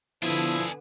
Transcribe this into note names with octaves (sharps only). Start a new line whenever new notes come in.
D3 F3 B3 D4 E4 G#4